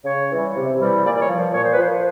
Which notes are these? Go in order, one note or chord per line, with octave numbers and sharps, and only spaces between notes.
C#3 C#5
E3 G3
C3
E3 G3
A#2 D5
D5
C#5
F3
C5
A#2 C#5
C5
B4
F3 C5